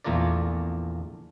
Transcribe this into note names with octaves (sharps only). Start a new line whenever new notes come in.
A#1 E2 A3 F4 A#4 D5